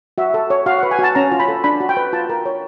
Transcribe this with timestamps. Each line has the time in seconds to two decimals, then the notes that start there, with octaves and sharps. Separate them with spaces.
0.18 F#4 E5
0.34 A4
0.50 C#5
0.66 F#4 F5
0.79 F#5
0.83 B4
0.91 G#5
0.99 F#4 A5
1.15 C#4 A#5
1.32 F4
1.40 B5
1.48 A4
1.64 D4 B5
1.80 F#4
1.89 G5
1.97 B4
2.13 F4 A5
2.29 A#4
2.46 C#5